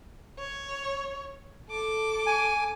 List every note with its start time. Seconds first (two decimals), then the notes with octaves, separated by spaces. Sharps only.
0.39 C#5
1.69 A4 D6
2.26 G#5